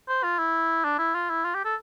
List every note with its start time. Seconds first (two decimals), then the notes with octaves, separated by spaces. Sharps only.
0.09 C5
0.24 F4
0.39 E4
0.84 D4
0.99 E4
1.15 F4
1.30 E4
1.45 F4
1.55 G4
1.65 A4